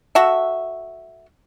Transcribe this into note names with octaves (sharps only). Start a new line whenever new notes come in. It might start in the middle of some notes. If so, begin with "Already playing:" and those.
F#4 A4 E5